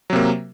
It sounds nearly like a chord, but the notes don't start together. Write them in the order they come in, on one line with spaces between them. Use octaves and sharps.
F#3 C3 A#3